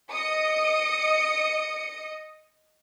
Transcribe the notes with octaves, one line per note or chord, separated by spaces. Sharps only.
D#5 D#6 C#7